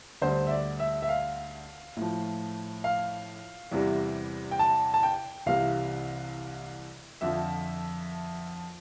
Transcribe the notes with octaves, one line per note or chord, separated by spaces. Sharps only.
D2 D3 G3 C5
E5
D5
E5
E5
F5
A2 F3
F5
E2 C3 E3 G3
G5
A5
A5
G5
C2 C3 E3 F5
F2 D3 F3 E5